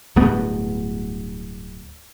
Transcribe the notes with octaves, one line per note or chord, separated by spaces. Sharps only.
D1 G2 A3 B3